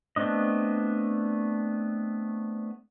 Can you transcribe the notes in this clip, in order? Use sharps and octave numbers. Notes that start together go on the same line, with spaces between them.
A3 B3 C4 D4 D#5